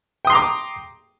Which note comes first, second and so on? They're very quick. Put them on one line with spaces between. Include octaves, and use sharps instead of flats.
G5 D#6 C6 A#5 D6